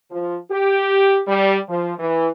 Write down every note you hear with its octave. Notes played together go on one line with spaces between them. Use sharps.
F3
G4
G3
F3
E3